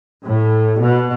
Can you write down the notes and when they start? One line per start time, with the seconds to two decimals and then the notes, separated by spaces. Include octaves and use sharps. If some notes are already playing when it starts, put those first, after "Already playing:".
0.23 A2
0.78 B2